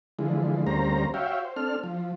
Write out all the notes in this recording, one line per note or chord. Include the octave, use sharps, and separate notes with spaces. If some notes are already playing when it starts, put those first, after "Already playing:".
D3 E3 F3 G#3
D2 G3 A#3 C#4 C5 A#5
F#4 C#5 E5 F5 G5
C5
C4 D4 A4 F6
F3